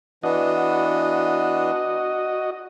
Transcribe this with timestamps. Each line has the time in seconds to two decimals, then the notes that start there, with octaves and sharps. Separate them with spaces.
0.23 E3 B3 D4 F#4 D#5